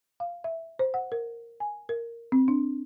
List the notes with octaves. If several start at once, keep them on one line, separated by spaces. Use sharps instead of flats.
F5
E5
C5
F#5
A#4
G#5
A#4
C4
D4